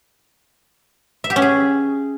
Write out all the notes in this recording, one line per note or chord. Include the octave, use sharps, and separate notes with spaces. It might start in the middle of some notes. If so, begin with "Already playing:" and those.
E5
G4
C#4
G#4